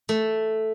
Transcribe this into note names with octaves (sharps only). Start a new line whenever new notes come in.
A3